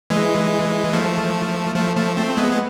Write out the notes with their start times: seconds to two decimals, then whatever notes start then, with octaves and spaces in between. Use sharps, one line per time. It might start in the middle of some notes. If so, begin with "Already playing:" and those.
0.10 E3 G#3
0.93 F3 A3
1.75 F3 A3
1.96 F3 A3
2.17 A3 C4
2.37 G#3 B3
2.52 G#3